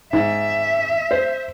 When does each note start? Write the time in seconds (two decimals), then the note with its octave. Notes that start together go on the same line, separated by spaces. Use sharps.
0.13 G#2 E5
1.11 C5